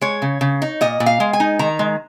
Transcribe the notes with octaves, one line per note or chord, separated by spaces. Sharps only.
G#3 C#5
C#3
C#3
D#4
A#2 D#5
A#2
F5
G#3
G#5
D#4
D#3 A#5
G#3